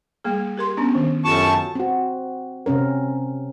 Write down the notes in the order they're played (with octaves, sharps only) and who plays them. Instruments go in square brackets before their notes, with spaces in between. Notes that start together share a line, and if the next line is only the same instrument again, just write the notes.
[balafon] G3 A#3 G#4
G4 A#4 C6
B3 C#4 D4
D#3
[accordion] F#2 A5 C#6 [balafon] F4 G4 A4
[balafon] F#4
[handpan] C4 F#4
C3 C4 C#4 A#4